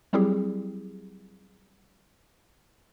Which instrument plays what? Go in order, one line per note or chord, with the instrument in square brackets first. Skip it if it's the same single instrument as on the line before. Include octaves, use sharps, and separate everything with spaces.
[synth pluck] F#3 G3 C4 E4 G4 G#4